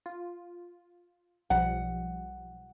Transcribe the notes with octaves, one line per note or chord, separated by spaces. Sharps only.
F4
B1 F3 G3 F#5